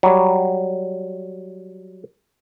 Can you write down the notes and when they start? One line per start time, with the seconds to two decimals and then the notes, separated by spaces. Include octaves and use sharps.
0.03 F#3 G3